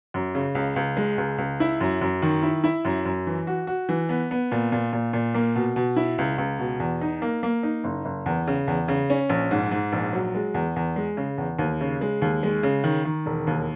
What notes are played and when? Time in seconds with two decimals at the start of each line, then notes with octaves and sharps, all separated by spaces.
0.14 F#2
0.35 C#3
0.55 C#2
0.76 C#2
0.97 G#3
1.18 C#2
1.38 C#2
1.60 E4
1.81 F#2
2.01 F#2
2.22 D#3
2.43 E4
2.64 E4
2.85 F#2
3.05 F#2
3.27 E3
3.47 F#4
3.67 F#4
3.89 E3
4.09 B3
4.31 B3
4.52 A#2
4.72 A#2
4.93 A#2
5.13 A#2
5.35 A#3
5.55 B2
5.76 B2
5.96 E4
6.18 C#2
6.38 C#2
6.59 B2
6.80 E2
7.01 D#4
7.22 A#3
7.43 A#3
7.63 D#4
7.84 F#1
8.05 F#1
8.26 E2
8.47 C#3
8.68 E2
8.88 C#3
9.10 C#4
9.30 A#1
9.51 G#2
9.71 G#2
9.92 A#1
10.13 F#3
10.35 G#3
10.54 E2
10.76 E2
10.96 G#3
11.17 C#3
11.38 E2
11.59 D#2
11.81 C#3
12.01 G#3
12.22 D#2
12.43 G#3
12.63 C#3
12.84 D#3
13.05 D#3
13.26 E1
13.47 D#2